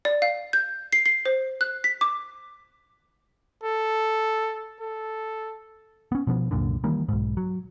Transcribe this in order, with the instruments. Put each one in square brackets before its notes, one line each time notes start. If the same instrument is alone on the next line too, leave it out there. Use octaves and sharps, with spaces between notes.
[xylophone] D5
F5
G6
C7
C7
C5
F#6
B6
D6
[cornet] A4
A4
[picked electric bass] B3 C#4
B2 F3 B3
C2 F#2 A#2 D3
D#3 E3 G3 A#3
B1 G#2
F#3